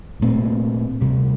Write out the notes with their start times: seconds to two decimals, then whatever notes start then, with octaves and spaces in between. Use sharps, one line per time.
0.20 C2 A#2 A3 C4
1.01 D2 C3 G3